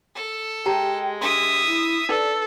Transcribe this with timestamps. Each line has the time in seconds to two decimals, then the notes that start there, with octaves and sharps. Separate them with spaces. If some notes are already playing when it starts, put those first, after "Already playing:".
0.15 A4
0.66 G#3 G4 G5 A5 A#5
1.21 D4 G4 E5 C6 D#6
1.66 E4
2.09 D#4 A4 B4 D5